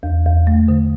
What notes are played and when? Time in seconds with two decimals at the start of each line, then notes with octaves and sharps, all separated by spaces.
0.03 E2
0.26 E2
0.47 A3
0.68 D3